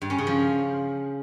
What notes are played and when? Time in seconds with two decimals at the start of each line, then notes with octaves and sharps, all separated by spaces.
0.02 G2
0.10 C#4
0.18 C#3
0.27 F3